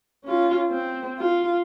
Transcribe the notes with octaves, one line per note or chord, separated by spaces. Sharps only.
C#4 F4
C4
F4